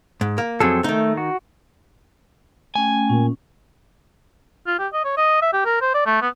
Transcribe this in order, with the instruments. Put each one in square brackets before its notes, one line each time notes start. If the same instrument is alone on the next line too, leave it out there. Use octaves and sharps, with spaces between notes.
[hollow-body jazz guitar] G#2
A#3
[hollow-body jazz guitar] F2 F#3 [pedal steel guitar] C4 G#4 A4
[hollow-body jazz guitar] D#3 D#4 [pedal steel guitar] A3
[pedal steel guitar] F#4
[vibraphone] A3 C#4 G5 [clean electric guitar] G#5
[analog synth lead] A#2 [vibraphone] C#4
[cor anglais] F4
G4
D#5
C#5
D#5
E5
G4
A#4
C5
D5
A3
B3